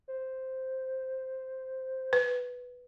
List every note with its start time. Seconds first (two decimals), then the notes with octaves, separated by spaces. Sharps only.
0.08 C5
2.13 B4